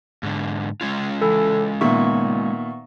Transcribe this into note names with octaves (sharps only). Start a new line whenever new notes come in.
G#2 D3
G#3 C#4 F4
E3 A4
A#2 D#3 B3 E5 C#6